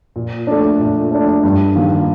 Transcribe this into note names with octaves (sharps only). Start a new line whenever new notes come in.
A#2
A3 D4
A#2
A3 D4
G2
D#3 A#3 F4